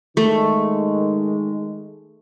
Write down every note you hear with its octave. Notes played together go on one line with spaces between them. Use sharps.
D#3 G#3 A3